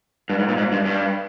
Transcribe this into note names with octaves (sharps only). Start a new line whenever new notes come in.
G2
G#2
A#2
G#2
G2
G2